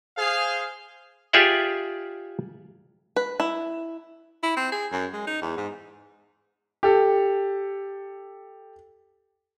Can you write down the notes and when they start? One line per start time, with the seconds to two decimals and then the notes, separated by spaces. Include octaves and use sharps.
0.18 G#4 C5 F5
1.33 F4 G4 G#4 D5 E5 F#5
3.16 B4
3.40 E4
4.43 E4
4.57 C4
4.72 G#4
4.92 F#2
5.13 G#3
5.27 D#4
5.42 E2
5.57 G#2
6.83 G4 A4